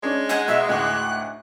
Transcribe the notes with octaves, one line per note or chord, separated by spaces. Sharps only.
G#3 C#4 D4
D#4 F#5 G#5
B1 E5
D2 A2 D6 F#6